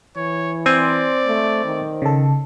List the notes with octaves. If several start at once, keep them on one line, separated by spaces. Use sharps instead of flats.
E3 C#5
C4 C5 D5 G#5
A3
D#3
C#3 A4